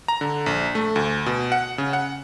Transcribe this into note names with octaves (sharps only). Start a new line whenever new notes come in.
A#5
D3
A#1
A3
D2
B2
F#5
C#3
F#5